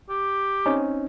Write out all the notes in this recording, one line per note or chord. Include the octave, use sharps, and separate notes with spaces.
G4
C4 C#4 D#4